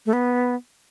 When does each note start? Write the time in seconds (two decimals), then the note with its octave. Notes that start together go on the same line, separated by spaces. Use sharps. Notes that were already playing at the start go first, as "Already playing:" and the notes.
0.06 A3
0.13 B3